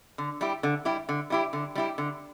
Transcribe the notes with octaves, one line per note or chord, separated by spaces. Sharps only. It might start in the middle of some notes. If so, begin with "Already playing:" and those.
D3
G3 E4 G4
D3
G3 E4 G4
D3
G3 E4 G4
D3
G3 E4 G4
D3